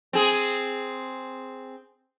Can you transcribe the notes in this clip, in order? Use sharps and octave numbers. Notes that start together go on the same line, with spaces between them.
C4 G#4